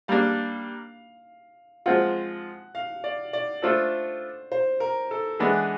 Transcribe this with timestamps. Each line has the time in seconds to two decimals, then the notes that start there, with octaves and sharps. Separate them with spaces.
0.08 G3 A#3 D4 F5
1.86 F3 G#3 C4 F4 F#5
2.75 F5
3.04 D5
3.33 D5
3.62 A3 D4 F4 A4 C5
4.52 C5
4.80 A#4
5.11 A4
5.39 E3 G#3 B3 D4 G#4